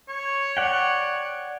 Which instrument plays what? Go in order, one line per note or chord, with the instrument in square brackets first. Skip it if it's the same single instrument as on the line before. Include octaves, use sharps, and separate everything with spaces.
[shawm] C#5
[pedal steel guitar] D5 F#5 G5